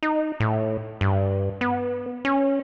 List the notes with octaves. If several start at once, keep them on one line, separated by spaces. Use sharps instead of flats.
D#4
A2
G2
B3
C#4